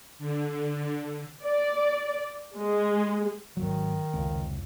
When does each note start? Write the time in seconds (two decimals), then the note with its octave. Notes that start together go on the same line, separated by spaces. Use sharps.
0.18 D3
1.43 D5
2.57 G#3
3.57 G#1 D#2 D#3 F#3
4.13 F1 C#2